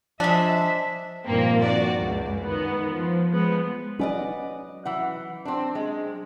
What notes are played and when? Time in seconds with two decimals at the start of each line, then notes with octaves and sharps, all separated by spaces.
0.20 F3 G#3 D4 C5 D#5 E5 A5
1.26 G2 A#2 D#3 F3 A#3 C4
1.64 F#4 D5
1.98 C#2 F#2
2.42 D#3 B3
2.89 F3
3.31 F3 G#3 B3
3.99 F#3 C#4 B4 D5 D#5
4.85 E3 F#5
5.45 C4 D4
5.75 G#3